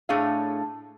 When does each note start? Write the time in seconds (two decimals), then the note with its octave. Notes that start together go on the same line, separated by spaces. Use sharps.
0.09 A2 A3 D4 G#4 C#5 F5